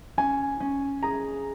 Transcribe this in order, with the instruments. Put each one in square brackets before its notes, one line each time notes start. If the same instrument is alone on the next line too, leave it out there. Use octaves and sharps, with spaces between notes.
[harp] C#4 [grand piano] G#5
[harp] C#4
[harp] G#4 [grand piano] A#5